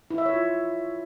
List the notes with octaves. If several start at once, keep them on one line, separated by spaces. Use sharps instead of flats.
E4
E5
C#5
F4